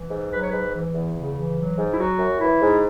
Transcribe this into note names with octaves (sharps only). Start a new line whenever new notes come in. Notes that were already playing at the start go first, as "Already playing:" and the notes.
Already playing: E3
G#2
F#3 B4
C#5
G#2 B4
E3
E2
C#3
E3
F#3
G#2
E4
F#3 F#4
F#2
E3 E4
G#2